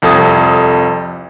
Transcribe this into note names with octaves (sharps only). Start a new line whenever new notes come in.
C2 F2 A4 A5 D#6 G#6